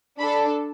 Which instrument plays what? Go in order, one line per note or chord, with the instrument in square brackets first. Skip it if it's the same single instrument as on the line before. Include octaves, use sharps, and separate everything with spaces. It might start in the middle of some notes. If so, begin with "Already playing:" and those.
[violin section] D4 A4 B5